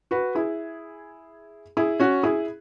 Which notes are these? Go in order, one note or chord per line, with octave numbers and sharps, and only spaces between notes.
F#4 B4
E4 G#4
E4 G#4
C#4 F#4
E4 G#4